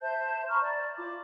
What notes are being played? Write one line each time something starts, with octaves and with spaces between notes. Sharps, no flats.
C5 E5 A5 G6
A#5 B5 C#6 F6
D5
F4 B5 D6